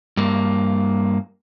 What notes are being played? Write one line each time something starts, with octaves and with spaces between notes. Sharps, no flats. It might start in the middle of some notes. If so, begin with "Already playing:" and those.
G2 A#3